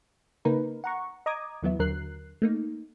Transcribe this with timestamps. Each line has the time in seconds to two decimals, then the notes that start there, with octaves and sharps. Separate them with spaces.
0.45 C#3 A#3 D#4 A#4 B4
0.84 F#5 A#5 C#6
1.26 D#5 A#5 D6 D#6 G#6
1.63 D#2 E3 F#3 B3 E4
1.79 D#2 D3 F#3 A#4 F#6 C7
2.42 A3 A#3 D#4